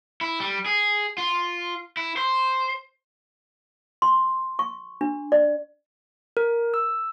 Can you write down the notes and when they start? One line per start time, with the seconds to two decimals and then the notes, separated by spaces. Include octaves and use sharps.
0.21 E4
0.40 G3
0.66 G#4
1.18 F4
1.97 E4
2.17 C5
4.02 C6
4.59 C#6
5.01 D4
5.32 D5
6.37 A#4
6.74 E6